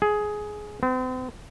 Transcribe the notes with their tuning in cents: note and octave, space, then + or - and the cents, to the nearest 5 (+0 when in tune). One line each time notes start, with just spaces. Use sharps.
G#4 +15
C4 -40